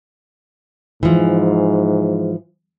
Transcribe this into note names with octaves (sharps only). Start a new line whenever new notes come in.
G#2 E3 F3